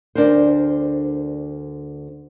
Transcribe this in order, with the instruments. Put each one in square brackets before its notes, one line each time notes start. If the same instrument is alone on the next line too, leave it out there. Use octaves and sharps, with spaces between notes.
[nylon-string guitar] D2 D4 A#4 C5